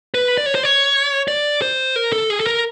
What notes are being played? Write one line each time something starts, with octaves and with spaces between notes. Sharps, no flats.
B4
D5
C#5
C5
C#5
D5
C5
A#4
A4
G#4
A4
A#4